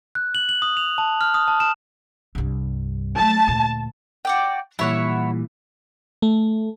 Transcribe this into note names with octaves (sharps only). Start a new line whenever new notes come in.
F#6
F#7
F#7
D#6
F7
A5
F6
D#6
A5
E7
C2 G2
F#3 A3 A5
D2 A#2
F#4 D5 G5
A#2 E3 G3 E4 C#5 F#5
A3